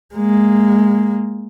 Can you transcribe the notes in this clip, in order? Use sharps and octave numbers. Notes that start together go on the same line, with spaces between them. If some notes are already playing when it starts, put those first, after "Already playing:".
G#3 A#3